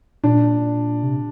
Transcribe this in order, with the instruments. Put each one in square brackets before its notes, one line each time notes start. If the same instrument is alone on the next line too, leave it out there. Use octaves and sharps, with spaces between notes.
[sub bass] A#2 [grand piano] D4
[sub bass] C3